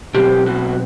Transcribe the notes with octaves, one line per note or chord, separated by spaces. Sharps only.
B2 F#3 C4 G4
F#4